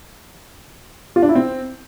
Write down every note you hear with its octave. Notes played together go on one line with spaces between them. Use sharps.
F4
D4
E4
C4